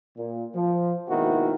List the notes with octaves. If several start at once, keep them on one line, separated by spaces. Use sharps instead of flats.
A#2
F3
G#1 D#2 B2 D#3 E4 F#4